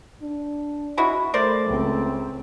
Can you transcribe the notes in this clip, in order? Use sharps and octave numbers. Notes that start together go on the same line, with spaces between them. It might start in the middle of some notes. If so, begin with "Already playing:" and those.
D4
G#3 E4 F#4
A3 A#4 C5 D5
C#2 C4